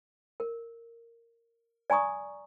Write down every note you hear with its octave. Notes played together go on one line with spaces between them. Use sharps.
A#4
D5 G#5 A#5 C#6 D#6